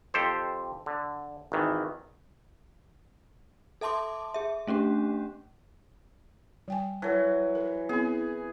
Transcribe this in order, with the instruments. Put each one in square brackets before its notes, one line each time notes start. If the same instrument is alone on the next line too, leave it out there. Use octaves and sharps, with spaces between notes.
[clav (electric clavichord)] F2 G4 A4 C5
D3
G#1 D#3 E3
[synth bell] A4 E5 A5 C6 D6
G#4 E5
A3 C#4 D4 G4
[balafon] G3 G5 G#5
[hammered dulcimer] E3 F#3 [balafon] A#4 A5
[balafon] A#4
[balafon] B3 C4 E4 [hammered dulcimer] G#4